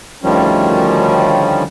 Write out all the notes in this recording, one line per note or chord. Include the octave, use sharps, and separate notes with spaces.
D2 D#3 F3 G3 C#4